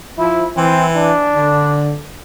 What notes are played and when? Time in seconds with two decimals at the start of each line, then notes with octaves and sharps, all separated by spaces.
0.18 F3 E4
0.56 E3 C4
0.96 D4
1.35 D3